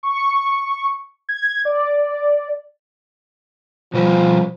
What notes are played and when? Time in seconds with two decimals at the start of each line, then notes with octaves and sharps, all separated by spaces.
0.03 C#6
1.29 G#6
1.65 D5
3.94 B2 F3 G3 B4